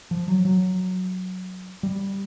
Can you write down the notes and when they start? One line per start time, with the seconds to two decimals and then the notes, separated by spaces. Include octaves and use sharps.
0.11 F3
0.28 F#3
0.45 F#3
1.83 G3